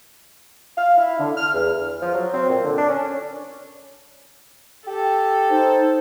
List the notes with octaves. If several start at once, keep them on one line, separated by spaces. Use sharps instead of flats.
F5
E4
D3
F6
E2
F3
F#3
C4
A#2
D3
D4
C#4
G4 A4
D#4 C5